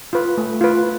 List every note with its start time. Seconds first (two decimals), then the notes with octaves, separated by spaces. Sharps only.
0.13 F4 B4
0.38 A3
0.61 F4 B4